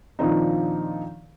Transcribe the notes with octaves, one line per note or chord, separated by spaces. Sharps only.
A#2 D#3 F3 C4 D4 D#4